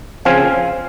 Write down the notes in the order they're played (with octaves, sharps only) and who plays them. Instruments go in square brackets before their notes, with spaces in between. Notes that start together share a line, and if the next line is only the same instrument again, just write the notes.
[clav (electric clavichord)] C#3 F3 C4 F5 G#5